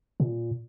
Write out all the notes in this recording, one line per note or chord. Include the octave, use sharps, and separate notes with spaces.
A#2